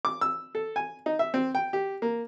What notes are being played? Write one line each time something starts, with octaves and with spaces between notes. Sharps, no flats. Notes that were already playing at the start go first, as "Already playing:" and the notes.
D6
E6
A4
G#5
D#4
E5
C4
G5
G4
A#3